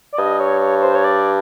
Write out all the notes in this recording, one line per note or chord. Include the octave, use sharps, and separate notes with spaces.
D5
G2 D#5
C#5
C#5
C#5
C5
C#5
D5